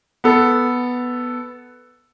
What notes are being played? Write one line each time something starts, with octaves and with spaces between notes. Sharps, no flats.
B3 A4